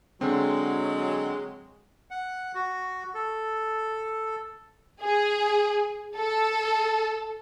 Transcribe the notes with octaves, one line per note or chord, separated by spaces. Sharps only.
D3 F#3 G#3 C4
F#5
F#4
A4
G#4
A4